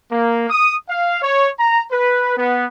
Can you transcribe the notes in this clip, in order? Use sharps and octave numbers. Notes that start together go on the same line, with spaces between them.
A#3
D#6
F5
C#5
A#5
B4
B3